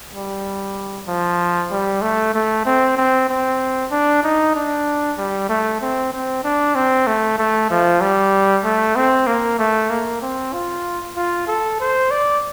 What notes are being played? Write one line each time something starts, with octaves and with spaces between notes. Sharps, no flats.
G3
F3
G3
A3
A3
C4
C4
C4
D4
D#4
D4
G3
A3
C4
C4
D4
C4
A3
A3
F3
G3
A3
C4
A#3
A3
A#3
C4
F4
F4
A4
C5
D5